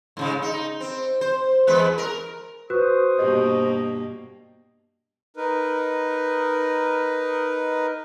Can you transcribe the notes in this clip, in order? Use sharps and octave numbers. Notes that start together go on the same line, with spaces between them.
G#2 C#3 G#3
D#4
C4
C5
E2 G#3 B4
A#4
F#4 B4 C5 C#6 D#6 F#6
G2 B2 A#3 G4 D#5
D#4 A#4 B4